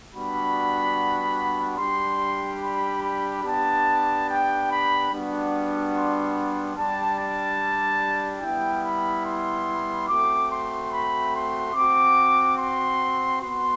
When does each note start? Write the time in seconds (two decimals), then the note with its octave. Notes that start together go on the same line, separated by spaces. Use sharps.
0.12 G3 B3 D4 F#4 B5
1.78 G3 D4 G4 C6
2.61 B5
3.03 B5
3.44 B3 D4 G4 A5
4.27 G5
4.69 B5
5.10 G3 B3 D4 F#4
5.94 C6
6.35 C6
6.77 G3 D4 G4 A5
7.18 A5
8.42 G3 B3 E4 G5
8.84 B5
9.25 C6
10.08 A3 C4 F#4 D6
10.50 C6
10.91 B5
11.33 C6
11.74 C4 F#4 D6
12.57 C6
13.40 B3 F#4 C6